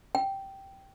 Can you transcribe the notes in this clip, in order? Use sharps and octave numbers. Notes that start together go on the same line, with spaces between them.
G5